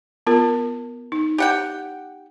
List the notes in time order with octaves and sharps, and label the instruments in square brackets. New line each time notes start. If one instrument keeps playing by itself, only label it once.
[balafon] B3 F4 A#4
D#4
[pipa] G4 F#5 G5